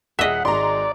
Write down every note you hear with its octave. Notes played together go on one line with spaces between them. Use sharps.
D#1 G#4 D#5 E5 F#5 B6
G#1 G#3 D5 A#5 C6